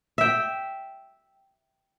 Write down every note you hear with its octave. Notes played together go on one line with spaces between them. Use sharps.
E5 G5